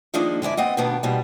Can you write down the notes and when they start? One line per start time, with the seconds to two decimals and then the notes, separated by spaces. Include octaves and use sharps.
0.14 D#3 F3 G#3 A#3 D4 D#4
0.42 D3 G#3 E4 D5
0.57 B3 C4 D#5 F#5
0.77 G2 B2 D#3 B3 D4
1.03 G#2 B2 G3